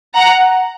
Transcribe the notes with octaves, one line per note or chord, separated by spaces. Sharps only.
F#5 A#5